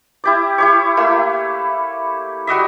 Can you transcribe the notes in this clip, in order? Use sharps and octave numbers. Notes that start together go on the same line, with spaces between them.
E4 G4 D5
E4 G4 C#5
A3 A#3 E4 E6
G3 F#4 D#5 E5